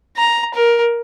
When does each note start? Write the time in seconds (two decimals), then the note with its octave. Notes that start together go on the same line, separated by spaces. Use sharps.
0.17 A#5
0.54 A#4